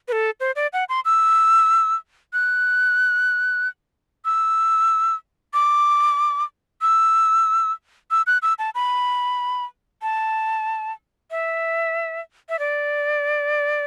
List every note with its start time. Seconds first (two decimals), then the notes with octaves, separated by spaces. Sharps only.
0.08 B4
0.12 A4
0.40 C5
0.56 D5
0.73 F#5
0.89 C6
1.05 E6
2.33 F#6
4.25 E6
5.54 D6
6.82 E6
8.11 E6
8.27 F#6
8.42 E6
8.59 A5
8.75 B5
10.02 A5
11.31 E5
12.49 E5
12.59 D5